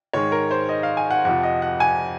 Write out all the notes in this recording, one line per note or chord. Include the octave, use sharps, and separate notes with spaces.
G#2 D#3 G#3 C#5
A#4
C5
D#5
F5
G#5
F#5
F2 C3 F3 F#5
D#5
F#5
G#5